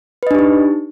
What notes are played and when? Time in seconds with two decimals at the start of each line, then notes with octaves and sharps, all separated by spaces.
0.23 B4
0.27 D#5
0.31 D4
0.35 G4
0.39 D#4